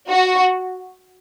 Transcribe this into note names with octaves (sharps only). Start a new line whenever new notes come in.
F#4